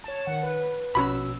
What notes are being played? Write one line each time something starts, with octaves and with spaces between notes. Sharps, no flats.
C#5 A5
D#3 F#5
B4
A#1 B2 C#4 F#4 B5 E6